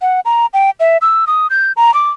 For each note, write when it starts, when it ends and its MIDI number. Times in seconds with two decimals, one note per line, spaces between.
0.02 0.20 78
0.25 0.46 82
0.53 0.70 79
0.80 0.97 76
1.01 1.25 88
1.27 1.47 87
1.50 1.72 91
1.77 1.94 82
1.94 2.10 86